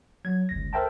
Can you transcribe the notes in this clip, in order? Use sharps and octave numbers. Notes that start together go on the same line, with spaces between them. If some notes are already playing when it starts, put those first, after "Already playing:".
F#3 G#6
G1 C#2 A#6
A4 A#4 C5 E5 G5 A5